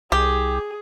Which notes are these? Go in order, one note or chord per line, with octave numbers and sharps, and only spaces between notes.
C2 G4 G#4